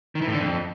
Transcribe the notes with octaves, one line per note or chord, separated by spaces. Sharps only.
D#3
E3
A2
D3
F2